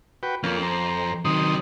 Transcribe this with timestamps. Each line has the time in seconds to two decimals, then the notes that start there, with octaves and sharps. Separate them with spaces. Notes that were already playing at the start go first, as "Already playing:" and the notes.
0.23 F#4 B4 G5
0.43 F2 A#3 C#4 F4
0.62 C5 A#5
1.25 C3 D#3 F#3 C6 D#6